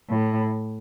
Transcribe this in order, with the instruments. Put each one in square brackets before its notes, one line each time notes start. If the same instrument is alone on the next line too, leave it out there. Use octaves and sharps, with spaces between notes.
[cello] A2